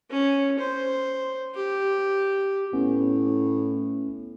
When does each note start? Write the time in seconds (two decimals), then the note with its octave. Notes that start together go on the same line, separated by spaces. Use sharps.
0.10 C#4
0.59 C5
1.55 G4
2.73 A2 B3 C#4